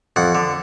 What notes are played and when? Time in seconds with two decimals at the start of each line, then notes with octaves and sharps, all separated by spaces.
0.16 F2 F#5
0.35 D3